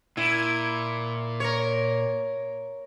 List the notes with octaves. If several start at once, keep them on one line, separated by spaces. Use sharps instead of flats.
A#2 E4
A#4 C#5